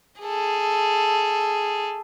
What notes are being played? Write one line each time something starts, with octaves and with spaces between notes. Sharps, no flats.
G#4 A4